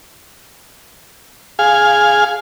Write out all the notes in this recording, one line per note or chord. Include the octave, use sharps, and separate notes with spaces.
G#4 F5